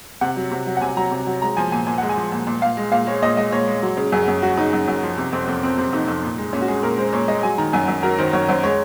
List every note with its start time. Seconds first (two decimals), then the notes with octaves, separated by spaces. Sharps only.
0.21 C3 F#5
0.37 F#3
0.51 C3
0.67 F#3
0.77 F#5
0.81 C3 G#5
0.97 F#3 A#5
1.11 C3
1.26 F#3
1.42 G#3 A#5
1.57 F3 G#5
1.72 A#2 G#5
1.87 A#2 G#5
1.98 G#3 F#5
2.09 G#5
2.17 F3
2.32 A#2
2.47 A#2
2.62 A#2 F5
2.77 G#3
2.92 A#2 F5
3.07 G#3 C#5
3.22 A#2 D#5
3.37 G#3 D#5
3.52 A#2 C#5
3.67 G#3
3.83 F#3
3.97 C#3
4.12 F#2 G#4
4.28 F#2
4.42 F#3 F#4
4.57 C#3 D#4
4.73 F#2
4.88 F#2
5.03 F3
5.18 C3
5.33 F2 C4
5.47 F2
5.63 F3 C4
5.78 C3 C4
5.93 F2 D#4
6.08 F2
6.23 A#2
6.38 G#3
6.53 A#2 C#4
6.62 F#4
6.68 G#3 G#4
6.83 A#2 A#4
6.98 G#3 C5
7.13 A#2 C#5
7.28 G#3 D#5
7.43 F#3 G#5
7.58 D#3 A#5
7.73 F#2 G#5
7.88 F#2
8.03 F#3 A#4
8.18 D#3 C5
8.33 F#2 C#5
8.48 F#2 C5
8.63 G#3 C#5